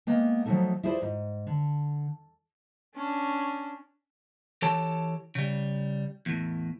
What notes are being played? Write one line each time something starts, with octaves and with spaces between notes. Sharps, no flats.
G#3 A#3 B3 G5
F3 F#3 G#3 A3 D#4 A4
E4 F4 G#4 B4 C5 D5
G#2
D3
C#4 D4
E3 G4 A4 C#5 A5
C#3 G3
E2 A2